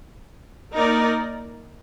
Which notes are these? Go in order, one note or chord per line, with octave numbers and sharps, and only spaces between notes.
A#3 D#4 A#4 D5